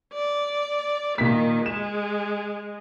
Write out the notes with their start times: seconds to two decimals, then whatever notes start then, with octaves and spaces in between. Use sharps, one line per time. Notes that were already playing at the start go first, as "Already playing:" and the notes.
0.14 D5
1.18 A#2 D#3 B6
1.66 G#3 E7